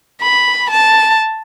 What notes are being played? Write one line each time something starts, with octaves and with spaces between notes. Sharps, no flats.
B5
A5